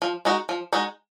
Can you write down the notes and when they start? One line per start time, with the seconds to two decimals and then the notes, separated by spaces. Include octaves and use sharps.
0.02 F3
0.25 G#3 D#4 F#4
0.49 F3
0.73 G#3 D#4 F#4